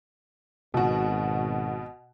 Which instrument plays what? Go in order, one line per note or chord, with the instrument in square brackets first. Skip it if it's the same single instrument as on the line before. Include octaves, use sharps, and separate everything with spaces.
[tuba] G#1 [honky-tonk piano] B2 F#4